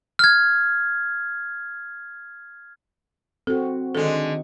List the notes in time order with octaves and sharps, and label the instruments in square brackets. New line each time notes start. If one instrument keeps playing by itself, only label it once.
[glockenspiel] F6 G#6
[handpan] C4 F#4 [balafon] A4
[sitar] D3 G#3 [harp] D#3 A3 [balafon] A4